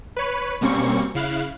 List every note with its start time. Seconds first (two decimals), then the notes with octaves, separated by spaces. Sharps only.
0.16 B4 C#5
0.61 B2 G3 A#3 C4 C#4 C#6
1.15 C#3 E4 F5 F#6